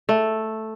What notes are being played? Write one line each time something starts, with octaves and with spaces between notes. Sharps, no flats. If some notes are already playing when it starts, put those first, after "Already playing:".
A3